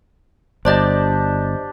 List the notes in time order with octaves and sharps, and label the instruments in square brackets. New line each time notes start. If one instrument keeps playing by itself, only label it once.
[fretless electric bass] G1 [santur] D4 G4 A5 [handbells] C5 D5 D#5